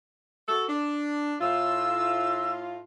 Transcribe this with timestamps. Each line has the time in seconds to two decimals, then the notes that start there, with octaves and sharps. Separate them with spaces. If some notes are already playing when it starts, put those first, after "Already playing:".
0.48 F#4 A4
0.69 D4
1.41 A2 F4 E6